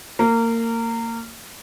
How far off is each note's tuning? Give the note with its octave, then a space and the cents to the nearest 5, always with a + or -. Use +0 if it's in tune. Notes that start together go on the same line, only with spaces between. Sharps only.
A#3 -25